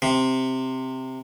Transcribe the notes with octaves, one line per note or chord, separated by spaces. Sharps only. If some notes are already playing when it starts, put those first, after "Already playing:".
C3